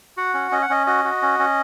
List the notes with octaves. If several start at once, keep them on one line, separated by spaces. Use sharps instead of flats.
F#4 F#5
C#4
C#4 D#5
F#5
C#4 D#5
F#4 D#5
F#4
C#4
C#4